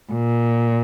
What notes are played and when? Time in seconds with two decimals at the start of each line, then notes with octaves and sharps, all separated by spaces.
0.13 A#2